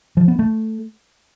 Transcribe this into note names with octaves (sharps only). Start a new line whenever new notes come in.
F3
B3
A3